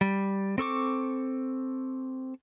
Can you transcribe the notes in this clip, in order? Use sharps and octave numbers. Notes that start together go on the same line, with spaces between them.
G3
C4 A4 C#6 D6